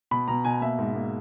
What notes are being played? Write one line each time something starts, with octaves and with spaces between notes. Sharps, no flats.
B2 B5
B2 A#5
B2 G#5
A#3 E5
G#2
A#3